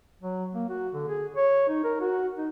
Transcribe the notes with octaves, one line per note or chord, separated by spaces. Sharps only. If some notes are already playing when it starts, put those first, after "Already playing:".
F#3
A#3
F#4
D3
G#4
C#5
D#4
A#4
F#4
D#4